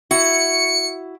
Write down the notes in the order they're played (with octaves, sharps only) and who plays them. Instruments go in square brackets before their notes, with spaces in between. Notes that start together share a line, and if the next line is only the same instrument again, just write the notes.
[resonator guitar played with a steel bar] E4 F#4 [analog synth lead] C#7